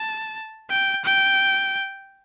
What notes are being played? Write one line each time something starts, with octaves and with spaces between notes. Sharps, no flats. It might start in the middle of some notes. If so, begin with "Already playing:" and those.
Already playing: A5
G5
G5